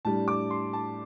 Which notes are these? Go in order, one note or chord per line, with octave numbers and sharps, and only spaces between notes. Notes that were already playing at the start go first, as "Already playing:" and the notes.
A2 G3 D4 A5
D6
C6
A5